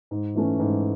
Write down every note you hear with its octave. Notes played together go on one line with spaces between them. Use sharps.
G#2
E3 A3 C#4
G#2